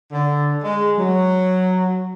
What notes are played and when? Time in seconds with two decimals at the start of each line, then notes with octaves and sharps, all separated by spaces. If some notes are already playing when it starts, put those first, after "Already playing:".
0.12 D3
0.63 G#3
0.98 F#3